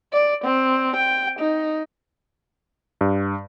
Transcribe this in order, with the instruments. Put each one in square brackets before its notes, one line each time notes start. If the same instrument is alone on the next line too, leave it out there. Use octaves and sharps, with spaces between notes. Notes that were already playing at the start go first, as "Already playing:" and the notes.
[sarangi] D5
C4
G5
D#4
[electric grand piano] G2